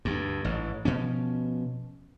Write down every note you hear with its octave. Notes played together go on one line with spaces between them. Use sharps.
D2 G2
A1 G#2
B2 F3 C#4